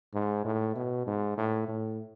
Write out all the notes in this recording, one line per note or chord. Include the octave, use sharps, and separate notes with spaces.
G#2
A2
B2
G#2
A2
A2